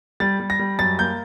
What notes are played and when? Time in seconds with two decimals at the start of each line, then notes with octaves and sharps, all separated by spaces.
0.20 G3 A6
0.40 G3
0.50 A#6
0.59 G3
0.79 F#2 A6
0.99 A#3 G6